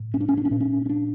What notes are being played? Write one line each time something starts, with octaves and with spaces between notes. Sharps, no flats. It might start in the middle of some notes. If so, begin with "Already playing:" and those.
Already playing: A2
C#4
D4
C#4
D4
C#4
A#2 D4
C#4
C#4
D4